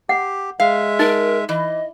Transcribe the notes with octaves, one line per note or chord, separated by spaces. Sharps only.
G4 F#5
G#3 E5 F5
D#4 A#4
E3 D#5